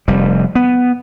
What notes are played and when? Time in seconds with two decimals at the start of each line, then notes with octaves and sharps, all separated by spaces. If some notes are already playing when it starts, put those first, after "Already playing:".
0.08 F1 G3
0.55 B3